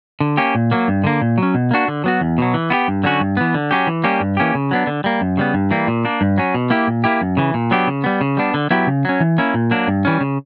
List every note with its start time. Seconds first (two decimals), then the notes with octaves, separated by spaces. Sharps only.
0.20 D3
0.37 A#3 C#4 G4
0.55 A#2
0.71 F#3 A#3
0.88 G2
1.04 D3 A#3
1.21 A#2
1.38 F#3 C#4
1.54 B2
1.71 A#3 D4 F#4
1.88 D3
2.04 F#3 B3 F#4
2.21 E2
2.38 B2 F#3
2.54 E3
2.70 B3 E4 G4
2.88 G2
3.04 D3 F#3 C#4 F#4
3.20 G2
3.37 E3 B3
3.54 D3
3.71 F#3 C#4 G4
3.87 E3
4.04 G3 A#3 C#4 G4
4.20 G2
4.37 E3 A#3 C#4 G4
4.55 C#3
4.71 F#3 B3 D4
4.87 D3
5.04 G3 A#3
5.21 F#2
5.37 C#3 G3 B3
5.54 G2
5.71 E3 G3 A#3
5.87 A#2
6.05 A#3 D4
6.21 G2
6.38 F#3 C#4
6.54 B2
6.70 A#3 E4 G4
6.87 A#2
7.04 A#3 E4 G4
7.21 F#2
7.37 C#3 E3
7.54 A#2
7.71 F#3 B3 D4 G4
7.87 C#3
8.04 G3 B3
8.21 C#3
8.37 G3 B3 D4
8.54 D3
8.71 F#3 B3 E4 G4
8.87 C#3
9.05 F#3 C#4
9.20 E3
9.38 A#3 C#4 E4
9.54 A#2
9.71 F#3 A#3 D4
9.88 G2
10.05 E3 G3 C#4
10.21 C#3